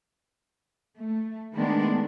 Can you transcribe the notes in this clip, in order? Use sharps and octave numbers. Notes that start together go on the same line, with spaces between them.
A3
D#3 G#3 A3 B3 D4